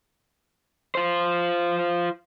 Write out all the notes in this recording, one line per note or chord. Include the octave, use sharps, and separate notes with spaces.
F4 C5